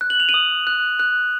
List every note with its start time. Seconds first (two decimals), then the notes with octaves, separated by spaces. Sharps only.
0.01 F#6
0.10 F#7
0.20 F7
0.29 D#7 F#7
0.34 D#6
0.67 F#6
0.99 F#6